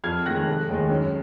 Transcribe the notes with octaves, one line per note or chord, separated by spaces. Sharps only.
F2 F6 G#6
D#3 G#3 F#6 A#6
F1
D#2 D#3 G#3
F#2